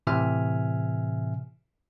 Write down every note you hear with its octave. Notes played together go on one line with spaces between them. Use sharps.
A2 C3 E3 E5 G#5 F6